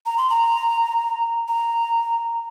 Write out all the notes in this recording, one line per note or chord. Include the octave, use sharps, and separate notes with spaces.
A#5
C6
A#5
A#5